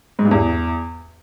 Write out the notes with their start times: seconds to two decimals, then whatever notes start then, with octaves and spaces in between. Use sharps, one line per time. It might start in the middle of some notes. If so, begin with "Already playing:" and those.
0.19 G#2
0.25 G2
0.31 E2